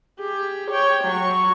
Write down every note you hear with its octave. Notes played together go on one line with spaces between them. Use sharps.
G4 G#4
C#5 G5
F#3 C#6